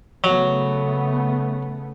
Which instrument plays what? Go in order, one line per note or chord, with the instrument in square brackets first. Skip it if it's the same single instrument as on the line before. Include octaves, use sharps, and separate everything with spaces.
[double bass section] C#3 A3 B3 [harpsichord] F#3